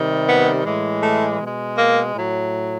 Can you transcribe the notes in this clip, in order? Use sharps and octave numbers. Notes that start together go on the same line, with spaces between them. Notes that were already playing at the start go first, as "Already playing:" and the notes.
Already playing: C3 D#3 G3
B3
A2 E3 G#3
A3
B2 G#3
A#3
A2 F#3